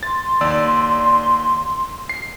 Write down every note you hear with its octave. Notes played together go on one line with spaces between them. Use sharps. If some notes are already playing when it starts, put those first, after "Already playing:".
C6 A6
D#2 D5 E6
C7